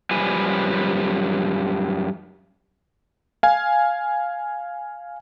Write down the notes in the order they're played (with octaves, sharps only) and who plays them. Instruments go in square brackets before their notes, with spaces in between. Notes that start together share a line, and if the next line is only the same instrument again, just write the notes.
[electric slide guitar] F#2 F3 G3 B4 G#5
[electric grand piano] F5 G#5